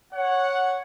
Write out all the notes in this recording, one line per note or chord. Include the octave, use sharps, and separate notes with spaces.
C#5 F#5